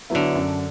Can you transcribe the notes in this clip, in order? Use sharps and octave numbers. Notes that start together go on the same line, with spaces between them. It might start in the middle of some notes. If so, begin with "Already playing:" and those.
D3 F#3 B3 E4
F#2